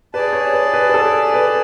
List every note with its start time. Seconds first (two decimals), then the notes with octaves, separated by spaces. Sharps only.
0.14 G#4 B4 D5 A5
0.33 C#5
0.53 B4
0.74 B4
0.89 B4
0.94 A4
1.34 B4